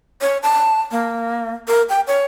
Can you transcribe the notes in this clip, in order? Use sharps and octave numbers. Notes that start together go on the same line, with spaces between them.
C#5
A5
A#3
A#4
G5
C#5